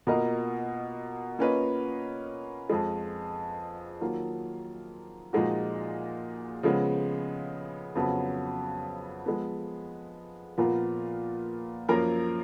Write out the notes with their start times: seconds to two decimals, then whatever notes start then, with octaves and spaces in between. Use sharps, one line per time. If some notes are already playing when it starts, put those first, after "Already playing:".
0.07 B2 A#3 F4 A#4 D#5
1.39 A#3 C#4 F4 B4 D#5
2.70 F2 F3 G#3
4.01 D#3 F#3 A#3 F4
5.33 A#2 F3 G#3 D#4 F#4
6.63 C#3 F3 G#3 B3
7.95 F2 C#3 F#3 B3
9.26 F3 G#3 B3
10.58 A#2 F3 B3 F4 A#4
11.89 F#2 F3 A#3 F4 A#4